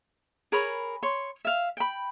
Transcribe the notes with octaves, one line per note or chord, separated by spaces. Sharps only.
G#4 A#4 C#5 B5
C#5 C6
E5 F5
G5 B5